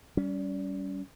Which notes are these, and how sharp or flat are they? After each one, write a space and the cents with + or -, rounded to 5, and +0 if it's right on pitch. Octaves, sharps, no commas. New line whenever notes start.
G3 -20 C#4 +20